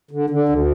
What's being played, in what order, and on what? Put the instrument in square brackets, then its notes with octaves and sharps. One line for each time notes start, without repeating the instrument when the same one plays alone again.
[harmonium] D3
D3
D2